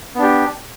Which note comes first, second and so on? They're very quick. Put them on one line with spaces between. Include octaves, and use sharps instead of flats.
B3 D4 G4